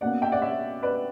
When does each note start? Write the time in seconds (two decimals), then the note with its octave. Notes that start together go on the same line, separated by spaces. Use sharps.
0.01 B2 A#3 C#4 D5 F#5
0.22 E5 G5
0.32 D5 F#5
0.42 C#5 E5
0.83 B4 D5